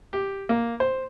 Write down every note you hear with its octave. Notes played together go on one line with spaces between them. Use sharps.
G4
A#3
C5